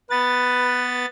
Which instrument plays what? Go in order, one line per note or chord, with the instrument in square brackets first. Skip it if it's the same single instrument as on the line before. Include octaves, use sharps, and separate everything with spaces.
[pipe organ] B3 A6 [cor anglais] B4